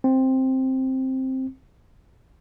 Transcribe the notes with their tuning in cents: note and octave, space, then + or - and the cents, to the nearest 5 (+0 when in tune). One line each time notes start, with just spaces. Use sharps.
C4 +5